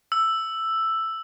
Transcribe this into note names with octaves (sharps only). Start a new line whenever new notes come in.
E6